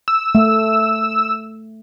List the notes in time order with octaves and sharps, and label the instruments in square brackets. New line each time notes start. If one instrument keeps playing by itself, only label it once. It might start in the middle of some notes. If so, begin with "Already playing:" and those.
[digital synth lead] E6
[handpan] A3